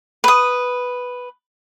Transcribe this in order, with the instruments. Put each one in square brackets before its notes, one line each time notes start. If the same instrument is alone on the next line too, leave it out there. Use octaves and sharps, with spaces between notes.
[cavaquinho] B4 D#6